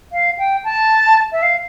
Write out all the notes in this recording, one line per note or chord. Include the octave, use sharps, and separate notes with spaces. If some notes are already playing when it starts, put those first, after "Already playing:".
F5
G5
A5
E5
F5